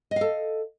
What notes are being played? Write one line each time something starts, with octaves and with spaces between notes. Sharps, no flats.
A4 D#5 F5